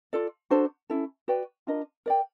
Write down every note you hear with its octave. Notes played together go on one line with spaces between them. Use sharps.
F4 A4 D5
D4 F#4 A4 C5
C#4 E4 A4
F#4 B4 D5 G5
D4 F4 A#4 D#5
A#4 D5 G5